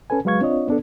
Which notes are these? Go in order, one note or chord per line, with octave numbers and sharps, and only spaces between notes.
C#4 A4 B4 G#5
F#3 G#3 B4 F5 C#6 G#6
C4 D4 F4 C#5 D#5
B3 D4 A4